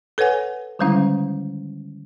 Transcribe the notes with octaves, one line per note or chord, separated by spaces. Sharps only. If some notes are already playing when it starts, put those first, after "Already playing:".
A4 B4 C#5 F#5 G#5
D3 D#3 G3 G#3 C#4 E4